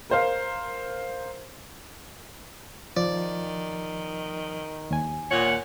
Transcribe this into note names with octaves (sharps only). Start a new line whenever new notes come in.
A#4 C5 F5
D#3 F3 D5
D#2 G#5
A#2 C#5 F#5